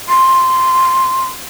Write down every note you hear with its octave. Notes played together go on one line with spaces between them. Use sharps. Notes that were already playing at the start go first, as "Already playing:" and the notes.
C6